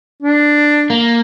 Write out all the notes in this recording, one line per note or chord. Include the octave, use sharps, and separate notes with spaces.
D4
A#3